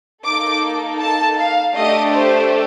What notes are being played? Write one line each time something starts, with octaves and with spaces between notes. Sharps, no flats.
A#3 D#4 A4 D6
A5
F5
A3 D4 G4 D#5
C5